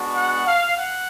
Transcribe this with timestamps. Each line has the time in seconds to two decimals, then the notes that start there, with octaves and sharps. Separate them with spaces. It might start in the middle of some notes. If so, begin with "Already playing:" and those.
Already playing: G#3 B3 D4 F#4
0.15 F#5
0.46 F5
0.77 F#5